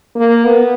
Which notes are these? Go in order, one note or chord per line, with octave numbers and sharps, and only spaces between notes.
A#3
B3